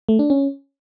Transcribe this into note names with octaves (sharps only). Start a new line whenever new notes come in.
A3
D4
C#4